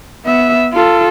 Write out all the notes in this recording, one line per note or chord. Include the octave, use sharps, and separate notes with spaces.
B3 E5
F4 A4